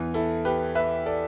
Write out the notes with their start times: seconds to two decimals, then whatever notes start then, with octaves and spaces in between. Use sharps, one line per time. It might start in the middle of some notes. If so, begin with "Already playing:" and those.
Already playing: E2 E3
0.14 E4 A4
0.45 G4 B4
0.75 B4 E5
1.06 A4 D5